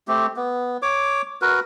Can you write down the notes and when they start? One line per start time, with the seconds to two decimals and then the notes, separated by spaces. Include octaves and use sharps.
0.08 A3 C4 G4
0.36 B3
0.82 C#5 D6
1.42 F#4 A#4 B4